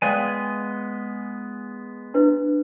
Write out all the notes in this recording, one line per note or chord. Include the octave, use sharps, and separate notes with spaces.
G#3 B3 D5 F5 G5 G#5
D4 E4 B4